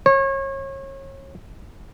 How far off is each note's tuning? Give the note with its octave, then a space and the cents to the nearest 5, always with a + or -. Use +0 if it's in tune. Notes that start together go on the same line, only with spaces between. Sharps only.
C#5 -30